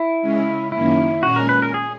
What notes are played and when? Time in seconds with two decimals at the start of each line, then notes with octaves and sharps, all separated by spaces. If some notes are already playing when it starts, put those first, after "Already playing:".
Already playing: E4
0.22 C#3 G#3 C#4
0.72 F#2 D#3 A#3 C#4 E4
1.23 A#2 G#3 C#4 F#4 G#4
1.36 A#4
1.49 B4
1.62 A#4
1.74 G#4